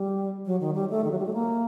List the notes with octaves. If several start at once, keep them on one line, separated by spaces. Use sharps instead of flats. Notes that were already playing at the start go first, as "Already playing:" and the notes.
Already playing: G3
F#3
D#3
G3
A3
D#3
F#3
G3
A3
A#3